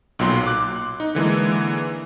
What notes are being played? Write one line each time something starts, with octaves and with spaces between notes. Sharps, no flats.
B1 A#2 F#3 C6
D6 F#6
D#4
D3 E3 G#3 A#3